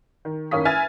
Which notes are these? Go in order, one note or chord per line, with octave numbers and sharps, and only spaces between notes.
D#3
F#1 D#3 C#4 F5 D#6 B6
B4 E5 G#5 F6 G#6 A6